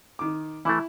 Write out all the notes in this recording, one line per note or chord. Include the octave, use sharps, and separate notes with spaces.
D#3 D6
E3 A3 E4